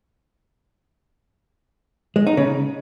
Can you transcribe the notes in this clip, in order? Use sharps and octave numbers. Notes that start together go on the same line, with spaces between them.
G#3
D#4
C#3